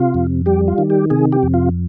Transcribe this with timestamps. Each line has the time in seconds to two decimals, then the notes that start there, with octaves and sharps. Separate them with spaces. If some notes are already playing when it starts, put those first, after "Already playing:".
Already playing: C3 F4
0.14 F2
0.46 G3 G4
0.68 F4
0.78 D#3
0.90 G4
1.10 C3 G#4
1.32 G4
1.43 F2
1.54 F4